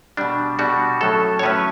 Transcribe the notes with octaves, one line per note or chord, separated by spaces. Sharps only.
B2 G3 D4
B2 G3 D4 F#4
A2 F#3 C#4 A4
C#5
A2 F#3 C#4 B4